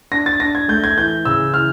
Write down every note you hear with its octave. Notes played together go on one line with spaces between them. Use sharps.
D4 A#6
A6
D4 A#6
G#6
A3 G6
G#6
E3 G6
C#3 E6
E3 F6